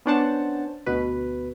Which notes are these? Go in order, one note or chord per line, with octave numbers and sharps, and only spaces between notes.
B3 C#4 D4 C5 F#5 A5
D2 B2 B4